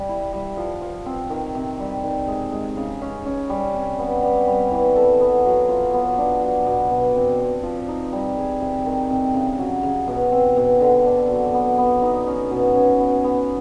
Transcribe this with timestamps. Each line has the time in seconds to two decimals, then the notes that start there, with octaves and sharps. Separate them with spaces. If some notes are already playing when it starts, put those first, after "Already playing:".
Already playing: G3
0.09 E4
0.33 G3
0.57 F3
0.82 F3
1.06 C4
1.30 D#3
1.55 C3
1.79 G3
2.04 D#3
2.28 G#3
2.52 G#3
2.76 C#3
3.02 C#4
3.26 C#4
3.49 G3
3.74 C3
3.99 B3
4.23 G3
4.47 G3
4.72 E3
4.96 A4
5.21 B3
5.45 F#3
5.69 F4
5.94 B3
6.18 D4
6.42 F#3
6.66 B2
6.91 B2
7.16 C4
7.40 C4
7.63 F3
7.88 D#4
8.12 G3
8.37 G#4
8.61 C3
8.86 D#3
9.10 C3
9.34 C#3
9.59 F#3
9.83 C#3
10.08 B2
10.32 C4
10.56 B2
10.80 D3
11.05 D4
11.29 F#3
11.54 B3
11.78 B3
12.02 D#4
12.27 C#4
12.51 B2
12.76 C#4
13.00 B3
13.24 B3